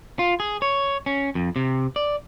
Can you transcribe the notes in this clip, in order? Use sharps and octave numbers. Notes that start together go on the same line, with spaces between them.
F4
G#4
C#5
C#4
F2
C3
D5